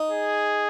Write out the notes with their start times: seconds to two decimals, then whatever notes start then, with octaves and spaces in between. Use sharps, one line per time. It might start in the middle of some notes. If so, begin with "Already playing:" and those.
Already playing: D#4
0.10 G#4